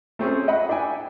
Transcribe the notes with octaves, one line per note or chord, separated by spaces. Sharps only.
A3 C4 C#4 G#4
D#5 F#5 B5
D4 E4 G5 G#5